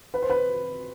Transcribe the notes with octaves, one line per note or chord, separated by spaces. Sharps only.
B4
C5
B4